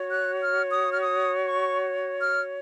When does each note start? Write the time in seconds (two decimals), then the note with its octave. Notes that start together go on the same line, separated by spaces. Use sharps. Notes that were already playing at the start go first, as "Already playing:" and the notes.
Already playing: F#4 C#5
0.10 F#6
0.40 F6
0.71 D#6
0.92 F6
1.01 D#6
1.46 C#6
2.20 F6